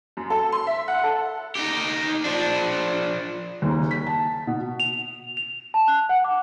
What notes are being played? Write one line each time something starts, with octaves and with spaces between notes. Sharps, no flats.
F#2
A4
C6
E5
F#5
A4
D#4 G4
F3 D4
F#1 D#2
B6
A5
B2
F7
F7
A5
F#6
F#5
D6